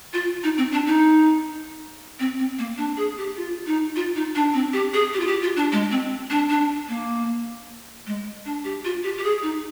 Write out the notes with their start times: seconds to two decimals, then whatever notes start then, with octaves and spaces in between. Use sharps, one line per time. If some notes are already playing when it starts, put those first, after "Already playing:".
0.13 F4
0.44 D#4
0.57 C4
0.72 D4
0.87 D#4
2.19 C4
2.39 C4
2.59 A#3
2.78 D4
2.97 G#4
3.18 G4
3.37 F4
3.67 D#4
3.96 F4
4.16 D#4
4.35 D4
4.54 C4
4.73 G4
4.94 G#4
5.13 G4
5.20 F4
5.27 G4
5.42 F4
5.56 D4
5.72 G#3
5.91 C4
6.30 D4
6.50 D4
6.89 A#3
8.07 G#3
8.45 D4
8.65 G4
8.85 F4
9.04 G4
9.18 G4
9.24 G#4
9.42 D#4